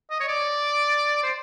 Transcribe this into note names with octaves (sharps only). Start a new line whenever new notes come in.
D#5
C#5
D5
C5